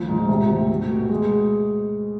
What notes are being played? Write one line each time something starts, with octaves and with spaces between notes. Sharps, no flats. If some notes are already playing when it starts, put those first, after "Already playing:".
Already playing: D2 F3
G#2
C3
D2
A3
B2
G#3